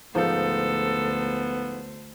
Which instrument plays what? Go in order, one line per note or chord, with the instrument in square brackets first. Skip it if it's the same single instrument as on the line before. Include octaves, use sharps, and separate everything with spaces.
[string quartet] D2 C5 [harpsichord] G#2 F3 [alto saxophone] B3 [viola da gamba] A4